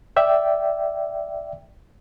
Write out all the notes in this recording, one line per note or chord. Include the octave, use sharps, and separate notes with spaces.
D5 E5 G5